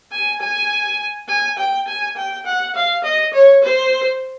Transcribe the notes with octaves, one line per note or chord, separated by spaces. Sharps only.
G#5
G#5
G#5
G5
G#5
G5
F#5
F5
D#5
C#5
C5